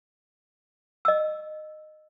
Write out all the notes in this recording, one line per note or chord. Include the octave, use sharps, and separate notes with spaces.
D#5 E6